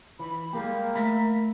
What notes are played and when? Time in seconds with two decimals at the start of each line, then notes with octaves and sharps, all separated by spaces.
0.19 E3 B5
0.53 G3 G#3 A#3 G4
0.95 A3 E5 B5